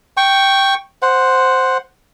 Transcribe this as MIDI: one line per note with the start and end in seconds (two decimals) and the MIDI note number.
0.17 0.74 79
0.17 0.74 85
1.02 1.78 72
1.02 1.78 78